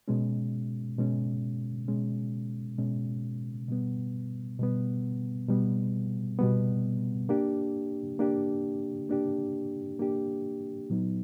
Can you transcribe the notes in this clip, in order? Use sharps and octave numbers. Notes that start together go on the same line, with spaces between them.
B2 G#3 C#4
B2 G#3 C#4
B2 G#3 C#4
B2 G#3 C#4
B2 G3 B3
B2 G3 B3
B2 G3 B3
B2 G3 B3
A#3 D4 G4
A#3 D4 G4
A#3 D4 G4
A#3 D4 G4
A#2 F#3 B3 D#4